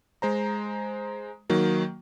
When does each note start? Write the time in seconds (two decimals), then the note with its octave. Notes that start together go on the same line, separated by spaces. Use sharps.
0.22 G#3 C5 A#5
1.49 D#3 F#3 A#3